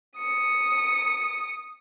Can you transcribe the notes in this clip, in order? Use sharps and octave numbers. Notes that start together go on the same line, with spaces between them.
D#6 C#7